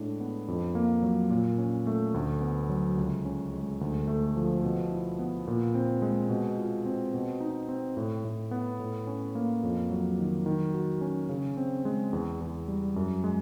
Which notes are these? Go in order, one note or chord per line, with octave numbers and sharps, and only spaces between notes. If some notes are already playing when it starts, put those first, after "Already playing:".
Already playing: A2 G#3 D4
B3
F2
A#3
F#3
A#2
C#4
A3
D2
B3
F#3
C#2
C#4
G#3
D2
A3
F3
B2
E4
B3
A#2
C4
G#3
B2
F4
C4
B2
D#4
C4
A2
A2
B3
A2
C#4
A#3
F2
F#3
D#3
D#3
F#4
C#4
C#3
C4
G#3
E2
E2
G3
F#2
G#3